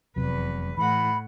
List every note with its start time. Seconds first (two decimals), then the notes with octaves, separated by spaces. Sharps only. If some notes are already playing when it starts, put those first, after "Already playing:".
0.16 F1 E2 C3 F#3 B4
0.78 A2 E3 F#5 B5